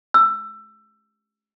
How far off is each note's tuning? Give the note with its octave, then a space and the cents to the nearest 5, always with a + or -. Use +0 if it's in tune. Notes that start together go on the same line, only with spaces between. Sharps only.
E6 +20